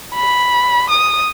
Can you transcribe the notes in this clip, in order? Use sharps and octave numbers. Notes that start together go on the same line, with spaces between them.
B5
D#6